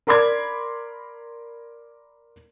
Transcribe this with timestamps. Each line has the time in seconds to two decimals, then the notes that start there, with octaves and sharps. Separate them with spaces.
0.07 A#4 D5 B5 C6 D6 G#6